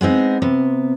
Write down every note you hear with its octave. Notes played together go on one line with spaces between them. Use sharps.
G#3 B3 C4 D#4
C3 B3